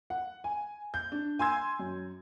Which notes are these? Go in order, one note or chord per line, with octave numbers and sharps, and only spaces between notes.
F#5
G#5
G6
D4
G#5 C6 E6 G#6
F#2